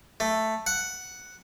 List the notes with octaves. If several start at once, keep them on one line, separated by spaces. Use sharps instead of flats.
A3
F#5